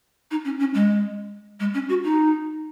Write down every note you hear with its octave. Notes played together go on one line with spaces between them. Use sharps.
D#4
C#4
C#4
G#3
G#3
C#4
F#4
D#4